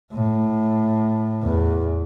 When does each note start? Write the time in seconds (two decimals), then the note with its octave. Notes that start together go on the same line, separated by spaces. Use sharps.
0.13 A2
1.44 E2